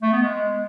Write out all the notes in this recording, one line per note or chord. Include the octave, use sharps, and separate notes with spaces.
A3
B3
G#3